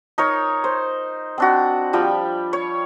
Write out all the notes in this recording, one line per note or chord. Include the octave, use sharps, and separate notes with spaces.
D#4 A#4 C#5
C5
C4 D4 F#4
F3 G3 G5 B5
C#5